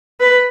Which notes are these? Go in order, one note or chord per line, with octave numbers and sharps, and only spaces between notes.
B4